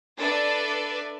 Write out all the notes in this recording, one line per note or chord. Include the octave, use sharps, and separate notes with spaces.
D4 A4 B4 D5 E5